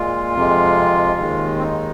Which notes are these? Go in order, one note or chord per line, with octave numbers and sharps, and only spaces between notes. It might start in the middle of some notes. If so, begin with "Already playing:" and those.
Already playing: A#2 G#3 F4
F2 C3 G#3
D#2 D#3 G#3
C4
D#4